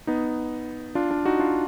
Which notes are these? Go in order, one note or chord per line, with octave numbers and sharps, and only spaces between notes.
B3 D#4
D4 F4
D4 F4
D#4 F#4
D4 F4